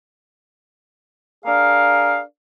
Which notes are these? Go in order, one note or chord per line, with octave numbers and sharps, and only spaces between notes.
D4 G#4 A#4 F5